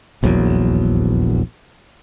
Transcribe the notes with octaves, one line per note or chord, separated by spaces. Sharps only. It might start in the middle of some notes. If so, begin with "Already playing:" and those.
D#1 A#1 E2 F#3